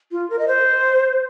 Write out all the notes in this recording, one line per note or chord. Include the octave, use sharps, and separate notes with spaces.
F4
A#4
D#5
C5